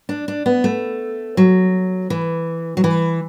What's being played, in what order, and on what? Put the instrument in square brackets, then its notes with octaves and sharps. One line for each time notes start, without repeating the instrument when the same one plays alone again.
[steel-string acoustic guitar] D4
D4
B3
A3
F#3
E3
F#3
E3